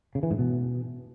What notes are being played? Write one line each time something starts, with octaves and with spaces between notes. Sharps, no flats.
C#3
E3
G#2
B2